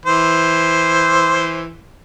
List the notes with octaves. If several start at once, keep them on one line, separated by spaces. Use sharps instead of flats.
E3 C5